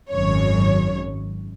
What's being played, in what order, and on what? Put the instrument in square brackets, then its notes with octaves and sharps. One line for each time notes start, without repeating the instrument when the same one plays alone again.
[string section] G#1 F#2 C#5